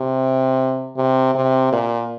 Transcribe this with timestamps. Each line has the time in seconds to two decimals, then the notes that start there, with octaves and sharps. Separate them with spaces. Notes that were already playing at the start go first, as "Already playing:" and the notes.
Already playing: C3
0.96 C3
1.35 C3
1.73 A#2